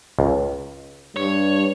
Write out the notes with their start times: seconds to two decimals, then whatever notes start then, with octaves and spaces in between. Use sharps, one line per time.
0.19 C#2
1.16 G2 C#5